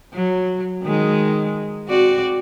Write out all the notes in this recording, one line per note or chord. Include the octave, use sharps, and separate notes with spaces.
F#3
D#3 G#3
C4 F#4 D5